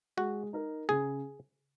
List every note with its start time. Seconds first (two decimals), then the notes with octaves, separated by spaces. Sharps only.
0.17 G#3 F#4
0.53 D#4 A#4
0.89 C#3 G#4